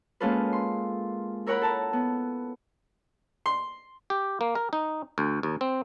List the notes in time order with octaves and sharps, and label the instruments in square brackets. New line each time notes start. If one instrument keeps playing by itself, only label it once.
[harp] G#3 A#3 C#4 F4 A4 B4
C6
E4 A#4 C#5 F#5 A#5 B5
A4 A5 A#5
B3
[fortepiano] C6
[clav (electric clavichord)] G4
A#3
A#4
D#4
D2
D#2
C4